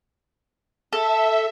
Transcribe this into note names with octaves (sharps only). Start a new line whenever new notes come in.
A4 E5